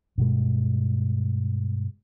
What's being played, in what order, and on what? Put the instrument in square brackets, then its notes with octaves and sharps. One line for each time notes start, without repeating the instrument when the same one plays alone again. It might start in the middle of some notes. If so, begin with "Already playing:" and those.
[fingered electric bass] G2 B2 G#3